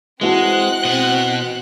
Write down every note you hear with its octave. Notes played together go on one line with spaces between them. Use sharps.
E3 G#3 C4 F#4 F#5 A5 F#6
B2 D#5